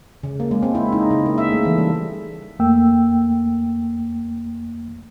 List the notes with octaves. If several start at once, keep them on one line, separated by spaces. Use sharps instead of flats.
C#3
A#3
G#3
C4
E4
D#4
C#3
A#3
E5
A3
E3
G3
F2 A3 A#3 G5 E6